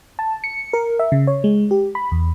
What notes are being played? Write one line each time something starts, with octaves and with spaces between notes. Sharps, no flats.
A5
C#7
A#4
E5
C#3
C#5
G#3
G4
B5
E2